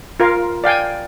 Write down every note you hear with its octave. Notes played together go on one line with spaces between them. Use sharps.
F4 A#4 F5
D5 F5 G5 G#5